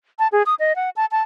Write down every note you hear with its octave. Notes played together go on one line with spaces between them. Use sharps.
A5
G#4
D#6
D#5
F#5
A5
A5